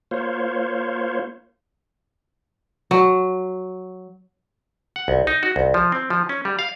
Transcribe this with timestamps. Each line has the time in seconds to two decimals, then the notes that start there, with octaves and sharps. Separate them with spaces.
0.11 A#3 F4 C5 C#5
2.91 F#3
4.96 F#5
5.08 C2
5.27 D#4
5.43 F#4
5.56 C2
5.74 F3
5.92 C4
6.10 F3
6.29 C#4
6.45 G3
6.59 F5